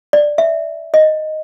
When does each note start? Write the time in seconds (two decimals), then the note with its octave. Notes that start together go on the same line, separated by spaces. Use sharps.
0.13 D5
0.38 E5
0.94 D#5